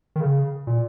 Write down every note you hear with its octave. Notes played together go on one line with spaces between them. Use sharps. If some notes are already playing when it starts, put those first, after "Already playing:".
D#3
C#3
A#2